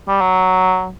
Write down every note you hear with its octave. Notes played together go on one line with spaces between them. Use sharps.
G3
F#3